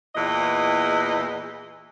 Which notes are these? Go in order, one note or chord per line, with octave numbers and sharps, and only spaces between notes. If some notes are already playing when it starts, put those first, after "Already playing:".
E2 A#2 E3 D#5